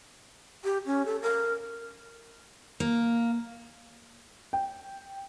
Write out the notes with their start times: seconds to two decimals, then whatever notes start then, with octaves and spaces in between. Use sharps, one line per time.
0.64 G4
0.86 C#4
1.06 A4
1.22 A#4
2.80 A#3
4.53 G5